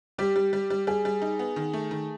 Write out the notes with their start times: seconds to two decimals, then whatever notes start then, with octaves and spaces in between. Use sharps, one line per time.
0.18 G3 G4
0.36 G3
0.53 G3
0.70 G3
0.87 G3 G#4
1.05 G3
1.22 D#4
1.39 B3
1.56 D#3
1.73 A3
1.91 D#3